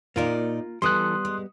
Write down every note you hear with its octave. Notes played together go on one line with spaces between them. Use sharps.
A#2 A#3 D#4 F4 A#4 D5
E3 G3 B3 A4 C6 D#6 F#6
G#3